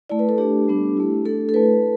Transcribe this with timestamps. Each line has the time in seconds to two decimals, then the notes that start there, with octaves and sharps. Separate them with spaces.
0.10 A3 E4 D5
0.19 B4
0.29 A4
0.38 A3 D4 G4
0.68 G3 B3 D4
0.97 A3 E4
1.25 A3 D4 A4
1.49 A4
1.54 A3 E4 B4